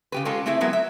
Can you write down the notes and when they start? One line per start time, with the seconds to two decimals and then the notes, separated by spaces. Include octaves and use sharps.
0.12 C#3 G4 B4
0.25 G#3 C#4 F4 G4 A4
0.46 A3 C4 E4 G#4 E5
0.61 F#3 G#3 B3 E4 A#4
0.73 E5